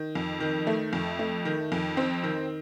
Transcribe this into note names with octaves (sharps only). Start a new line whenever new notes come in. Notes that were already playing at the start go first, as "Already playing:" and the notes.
Already playing: D#3
F2
D#3
A3
F2
A3
D#3
F2
C4
D#3